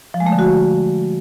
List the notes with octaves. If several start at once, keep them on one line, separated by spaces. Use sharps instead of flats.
F3
G#3
A3
D3
F#4